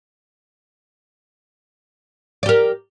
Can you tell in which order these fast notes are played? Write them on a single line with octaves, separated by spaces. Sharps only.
D5 G4 A#4